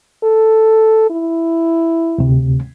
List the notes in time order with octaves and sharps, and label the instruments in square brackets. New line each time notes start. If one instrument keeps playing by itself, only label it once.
[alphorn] A4
E4
[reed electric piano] D2 C3